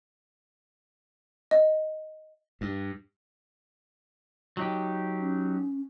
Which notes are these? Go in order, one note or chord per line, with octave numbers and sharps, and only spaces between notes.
D#5
G2
F#3 D#4 G4
C#4